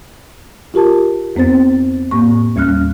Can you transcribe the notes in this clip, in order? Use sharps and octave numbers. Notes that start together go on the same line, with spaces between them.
F4 G4 A#4 A5
F2 B3 C4 C5 A6
A2 A#3 C#6
D#2 G3 C#4 F6 F#6